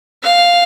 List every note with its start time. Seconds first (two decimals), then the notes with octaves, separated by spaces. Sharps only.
0.23 F5